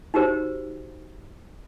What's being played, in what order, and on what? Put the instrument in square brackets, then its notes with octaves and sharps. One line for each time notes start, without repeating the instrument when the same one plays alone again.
[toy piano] D#4 F#4 G4 A#4 C5